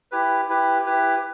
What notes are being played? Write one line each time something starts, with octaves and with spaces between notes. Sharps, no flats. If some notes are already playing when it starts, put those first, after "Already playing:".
E4 G4 B4
E4 G4 B4
E4 G4 B4